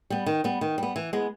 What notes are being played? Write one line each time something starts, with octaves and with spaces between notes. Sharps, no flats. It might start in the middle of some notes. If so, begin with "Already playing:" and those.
G3 B3
D#3
G3 B3
D#3
G3 B3
E3
G#3 B3